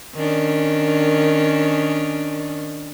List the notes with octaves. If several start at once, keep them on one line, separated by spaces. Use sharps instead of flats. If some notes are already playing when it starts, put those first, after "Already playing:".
D#3 C#4 D4